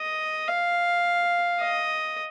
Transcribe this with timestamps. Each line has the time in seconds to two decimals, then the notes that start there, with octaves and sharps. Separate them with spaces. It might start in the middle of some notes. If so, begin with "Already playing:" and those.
Already playing: D#5
0.48 F5
1.60 D#5